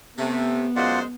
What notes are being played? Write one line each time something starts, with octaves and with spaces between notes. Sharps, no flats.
C3 A3 B3
F#2 G#3 F4 C5 D5 F#5